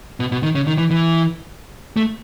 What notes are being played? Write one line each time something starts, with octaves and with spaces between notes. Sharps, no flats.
B2
B2
D#3
C#3
D#3
E3
E3
A3